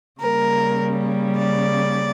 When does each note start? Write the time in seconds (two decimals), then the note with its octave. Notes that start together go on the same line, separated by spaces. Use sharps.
0.21 C#3 G3 A#3 A#4
1.38 D5